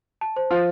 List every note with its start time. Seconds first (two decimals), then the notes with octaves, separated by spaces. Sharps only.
0.21 A5
0.36 C5
0.51 F3 F4 C5